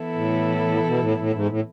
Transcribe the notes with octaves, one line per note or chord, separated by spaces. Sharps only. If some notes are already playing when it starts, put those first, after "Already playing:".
Already playing: E3 B3 E4 A4
A2
B2
A2
A2
G#2
A2